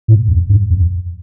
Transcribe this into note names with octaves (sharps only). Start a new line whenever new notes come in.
A2
F2
G2
F2